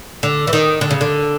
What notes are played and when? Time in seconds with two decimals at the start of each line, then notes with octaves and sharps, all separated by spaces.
0.23 D3
0.47 E3
0.53 D#3
0.81 D3
0.91 C#3
1.01 D3